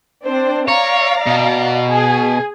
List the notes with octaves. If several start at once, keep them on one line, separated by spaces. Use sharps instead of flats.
C4 D4 C5
C#5 D5 F5 A#5
B2
G#4 G#5